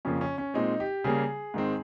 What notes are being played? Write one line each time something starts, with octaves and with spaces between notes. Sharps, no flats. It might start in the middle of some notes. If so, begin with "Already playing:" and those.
F2 C#3 F3 A#3 C#4
C#4
C#4
A#2 G#3 C4 D#4
G4
C#3 G3 A#3 G#4
G#2 D#3 G#3 C4